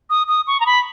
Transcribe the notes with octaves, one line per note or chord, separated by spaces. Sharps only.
D#6
D#6
C#6
A#5
B5